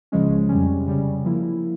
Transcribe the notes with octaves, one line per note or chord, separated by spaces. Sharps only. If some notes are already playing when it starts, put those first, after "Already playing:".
C#2 C#3 F3 G#3 C#4
F2 C3 G3 C#4
C#3 G3 C#4
F3 A#3 E4